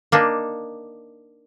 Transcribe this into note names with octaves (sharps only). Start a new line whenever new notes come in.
A#3 D4 D#4